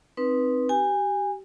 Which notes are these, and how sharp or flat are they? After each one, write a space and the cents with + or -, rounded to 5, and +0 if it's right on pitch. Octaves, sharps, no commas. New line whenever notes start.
C4 +0 D#4 +0 B4 -15
G4 -25 G#5 -25